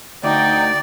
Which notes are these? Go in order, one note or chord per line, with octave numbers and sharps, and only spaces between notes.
D2 D#4 D5 G5